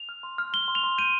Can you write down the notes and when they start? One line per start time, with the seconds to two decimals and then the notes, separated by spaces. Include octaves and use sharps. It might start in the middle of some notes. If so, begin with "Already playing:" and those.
Already playing: F7
0.09 F6
0.23 C6
0.38 F6
0.53 C6 G7
0.68 C6
0.75 F7
0.83 C6
0.98 G6 D#7